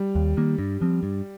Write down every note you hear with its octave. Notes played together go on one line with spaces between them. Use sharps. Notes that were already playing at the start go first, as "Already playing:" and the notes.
Already playing: G3
D#2
D#3 A#3
G2
F3 C4
G2